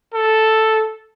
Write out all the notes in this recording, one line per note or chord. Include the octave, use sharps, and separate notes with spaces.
A4